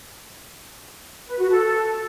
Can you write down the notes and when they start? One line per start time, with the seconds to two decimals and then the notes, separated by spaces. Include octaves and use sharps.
1.27 B4
1.39 F#4
1.50 A4